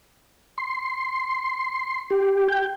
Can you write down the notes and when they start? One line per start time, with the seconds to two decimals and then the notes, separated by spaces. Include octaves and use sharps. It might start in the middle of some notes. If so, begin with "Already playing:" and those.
0.58 C6
2.10 G4
2.48 G5